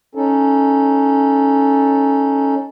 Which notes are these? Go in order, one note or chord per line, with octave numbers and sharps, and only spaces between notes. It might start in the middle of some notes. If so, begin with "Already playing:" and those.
C#4 D#4 A4